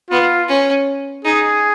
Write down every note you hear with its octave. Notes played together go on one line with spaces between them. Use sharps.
B3 F4
C#4
D#4 G#4